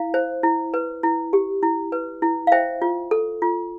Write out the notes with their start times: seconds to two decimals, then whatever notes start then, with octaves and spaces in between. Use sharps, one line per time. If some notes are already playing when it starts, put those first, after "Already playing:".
Already playing: E4 F5
0.14 C5
0.43 E4
0.74 B4
1.03 E4
1.33 G4
1.63 E4
1.92 B4
2.22 E4
2.47 F5
2.52 C5 E5 G5
2.82 F4
3.11 A4
3.42 F4